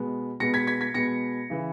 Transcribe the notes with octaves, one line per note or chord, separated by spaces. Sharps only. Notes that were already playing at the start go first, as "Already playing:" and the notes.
Already playing: B2 G#3 B3
B2 G#3 B3 A#6 C#7
G#6 B6
G#6 B6
G#6 B6
B2 G#3 B3 A#6 C#7
C#3 E3